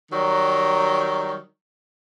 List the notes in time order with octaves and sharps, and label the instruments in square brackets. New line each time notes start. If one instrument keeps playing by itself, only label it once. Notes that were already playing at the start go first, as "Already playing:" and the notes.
[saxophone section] D#3 F#3 G3